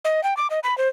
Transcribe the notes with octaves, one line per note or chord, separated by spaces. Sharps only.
D#5
G5
D6
D#5
B5
C5